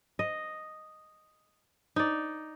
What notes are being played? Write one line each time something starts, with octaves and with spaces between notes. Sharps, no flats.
D#5
D#4 D5